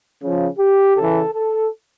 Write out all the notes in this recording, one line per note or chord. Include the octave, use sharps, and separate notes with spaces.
C#3 F3
G4
C#3 E3 A4
A4